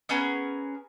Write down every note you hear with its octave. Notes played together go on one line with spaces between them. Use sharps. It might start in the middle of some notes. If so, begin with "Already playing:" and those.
B3 C#4 G#4 A#4